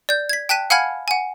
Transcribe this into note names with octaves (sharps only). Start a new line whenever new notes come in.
D5 G6
G#6 B6
G5 A5 F#6 B6 D#7
F5 F#5 G#5 B5 F6 G#6
F#5 G#5